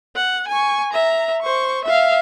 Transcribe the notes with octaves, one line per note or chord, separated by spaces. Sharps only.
F#5
G#5 C#6
E5 A#5
C5 C#6
E5 F5